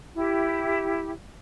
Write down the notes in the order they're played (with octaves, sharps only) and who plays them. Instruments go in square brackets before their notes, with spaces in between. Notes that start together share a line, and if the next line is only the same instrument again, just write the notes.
[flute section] E4 G4